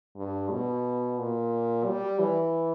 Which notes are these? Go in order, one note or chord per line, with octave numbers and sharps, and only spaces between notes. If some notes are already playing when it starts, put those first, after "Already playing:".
G2
B2
A#2
G3
E3